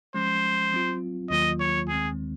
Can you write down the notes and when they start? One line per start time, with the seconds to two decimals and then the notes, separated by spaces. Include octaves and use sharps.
0.14 F3 G#3 C#4 C5
0.73 F#3 C4 F4
1.30 D#2 D#3 F#3 A#3 F4 D#5
1.60 C#5
1.88 D#2 D#3 G#3 C4 G#4